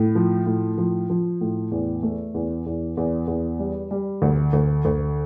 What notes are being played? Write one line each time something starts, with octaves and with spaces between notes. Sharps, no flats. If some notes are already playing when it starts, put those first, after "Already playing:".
Already playing: A2
F3
A2
F3
F3
A2
E2
A3
E2
E2
E2
E2
G3
G3
D2
D2
D2